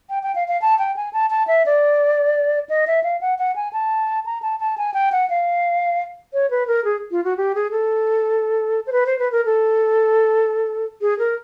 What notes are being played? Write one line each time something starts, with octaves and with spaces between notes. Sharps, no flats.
G5
G5
F5
F5
A5
G5
G#5
A5
A5
E5
D5
D#5
E5
F5
F#5
F#5
G#5
A5
A#5
A5
A5
G#5
G5
F#5
F5
C#5
B4
A#4
G#4
F4
F#4
G4
G#4
A4
C5
B4
C5
B4
A#4
A4
G#4
A#4